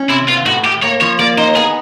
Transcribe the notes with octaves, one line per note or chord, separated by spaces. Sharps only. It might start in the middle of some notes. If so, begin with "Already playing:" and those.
Already playing: C#4
C3 E4
B3 F4
A2 F#4
A2 G4
A#3 C#5
F3 C#5
A#3 D5
D#4 C5
B3 G#4